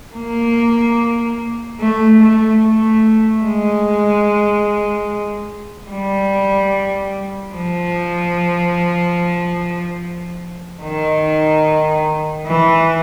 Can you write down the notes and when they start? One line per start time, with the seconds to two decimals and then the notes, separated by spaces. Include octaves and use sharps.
0.15 A#3
1.80 A3
2.21 A3
2.62 A3
3.44 G#3
5.90 G3
7.54 F3
10.83 D#3
12.47 E3